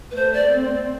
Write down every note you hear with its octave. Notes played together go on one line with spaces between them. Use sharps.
B4
A3 C5
D5
C4